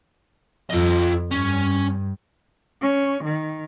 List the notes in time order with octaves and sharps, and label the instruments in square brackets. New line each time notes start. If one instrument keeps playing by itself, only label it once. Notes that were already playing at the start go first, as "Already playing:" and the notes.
[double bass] F2 [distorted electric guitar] F4 D#5
[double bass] G2 [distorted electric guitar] C#4
[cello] C#4
D#3